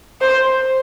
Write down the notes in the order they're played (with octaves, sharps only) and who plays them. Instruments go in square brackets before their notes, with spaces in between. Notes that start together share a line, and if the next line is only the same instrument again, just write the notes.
[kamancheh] C5